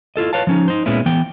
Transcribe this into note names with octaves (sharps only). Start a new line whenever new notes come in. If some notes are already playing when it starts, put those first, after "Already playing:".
E4 F4 A4 D#5
B4 C#5 F5 A5
F3 C#4 D#4
D#4 C5
A#2 G#3 B3 C#4 E4
E3 B3 G5